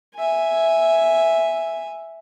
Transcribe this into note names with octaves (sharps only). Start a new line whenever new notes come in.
E5 G#5